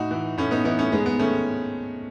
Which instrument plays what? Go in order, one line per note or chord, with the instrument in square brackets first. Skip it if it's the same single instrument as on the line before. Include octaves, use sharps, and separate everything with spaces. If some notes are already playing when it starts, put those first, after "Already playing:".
Already playing: [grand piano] A2 D#4 F#4
E3
A2 A3 C#4
B3 D#4
E3 B3 D#4
A3 C#4
G#2 G#3 B3
G#3 B3
D#3 A3 C#4